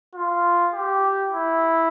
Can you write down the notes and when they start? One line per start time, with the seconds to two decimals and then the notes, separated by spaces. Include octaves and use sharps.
0.15 F4
0.73 G4
1.31 E4